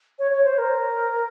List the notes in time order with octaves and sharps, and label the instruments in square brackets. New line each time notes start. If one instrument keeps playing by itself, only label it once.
[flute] C#5
C#5
C5
A#4